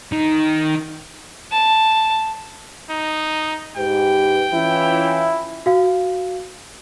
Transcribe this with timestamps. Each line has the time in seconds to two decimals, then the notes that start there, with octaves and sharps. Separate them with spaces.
0.12 D#3
1.52 A5
2.90 D#4
3.77 G#2 G4 B4 G5
4.53 E3 C#4 E4 F4
5.66 F#4 F5